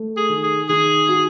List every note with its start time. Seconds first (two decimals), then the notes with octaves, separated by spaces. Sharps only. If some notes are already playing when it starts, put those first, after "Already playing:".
Already playing: A3
0.17 G#4
0.29 D#3
0.43 G#4
0.69 D#3 G#4
1.09 F#4